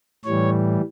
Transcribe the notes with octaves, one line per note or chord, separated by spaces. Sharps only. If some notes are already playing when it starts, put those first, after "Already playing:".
A2 E3 G3 C#5